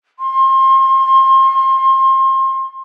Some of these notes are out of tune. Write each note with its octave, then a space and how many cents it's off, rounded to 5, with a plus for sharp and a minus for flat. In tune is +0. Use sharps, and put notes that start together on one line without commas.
C6 +30